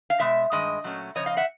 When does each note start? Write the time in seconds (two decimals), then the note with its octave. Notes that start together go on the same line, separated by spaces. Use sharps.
0.10 F5
0.20 B2 G#3 E5
0.52 G2 D#3 G#3 D#5
0.84 A#2 F#3 A3 C#4
1.15 C#3 F3 C#4 C#5 D#5
1.26 D#5 F5
1.37 E5 F#5